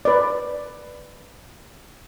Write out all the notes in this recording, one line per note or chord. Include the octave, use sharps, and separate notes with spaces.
B4 D5